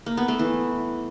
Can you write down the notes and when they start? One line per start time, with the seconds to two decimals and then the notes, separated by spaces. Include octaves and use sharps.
0.06 A#3
0.17 B3
0.28 A3
0.39 E3